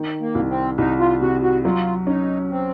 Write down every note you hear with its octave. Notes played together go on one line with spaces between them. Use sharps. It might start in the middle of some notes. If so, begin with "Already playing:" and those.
Already playing: D#3
A#3
C2
C4
C2 D#4
F4
C3 F#4
F#4
F#3 F4
C#4 D#4
C4